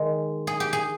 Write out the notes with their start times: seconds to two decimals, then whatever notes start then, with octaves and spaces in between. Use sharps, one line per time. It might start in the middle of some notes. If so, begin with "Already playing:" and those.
Already playing: D#3 G#3
0.47 G#4
0.60 G4
0.73 G#4